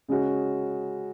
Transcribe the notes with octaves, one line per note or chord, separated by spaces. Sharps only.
C#3 G#3 C#4 F#4